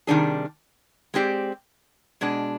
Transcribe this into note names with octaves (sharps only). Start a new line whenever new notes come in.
C3 D#3 G3 D4 G#4
G#3 C4 G4 D5
B2 G#3 D4